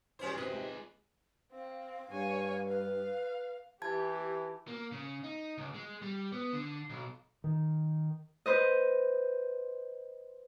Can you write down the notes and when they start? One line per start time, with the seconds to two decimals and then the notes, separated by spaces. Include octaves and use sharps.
0.19 F#2 E3 G3 C#4 C5
0.38 C3 C4 G#4 B4 D#5
0.52 G#3 D#4 F4
1.52 C4 F5
2.11 G2 C#5 G#5
2.67 B4 F5
3.82 E3 G4 A5 G#6
4.68 A#3
4.92 C#3
5.24 D#4
5.58 C#2
5.75 G#3
6.02 G3
6.32 B3
6.53 D3
6.90 B1
7.44 D#3
8.46 B4 C5 D#5